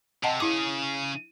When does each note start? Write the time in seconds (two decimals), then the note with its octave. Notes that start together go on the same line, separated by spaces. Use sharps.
0.24 C3 D#5 F#5 A5
0.40 C#3 E4 G#4 D6